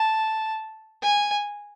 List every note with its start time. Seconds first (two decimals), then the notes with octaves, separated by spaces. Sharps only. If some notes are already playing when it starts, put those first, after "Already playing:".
Already playing: A5
1.02 G#5